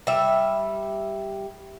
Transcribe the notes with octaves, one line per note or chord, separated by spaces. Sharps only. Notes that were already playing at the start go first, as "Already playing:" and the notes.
G3 E5